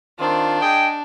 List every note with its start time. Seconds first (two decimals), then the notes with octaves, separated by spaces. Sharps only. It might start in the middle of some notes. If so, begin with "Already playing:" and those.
0.19 D#3 C4 D4 F4
0.61 G#4 D#5 G5